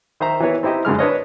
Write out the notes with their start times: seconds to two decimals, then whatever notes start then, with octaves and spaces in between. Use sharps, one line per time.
0.20 D#3 C5 E5 A#5
0.40 E3 B3 E4 B4 C#5
0.63 C4 D#4 E4 G4 D#5
0.85 F#2 D3 G#3 F6
0.99 D4 B4 C#5 D#5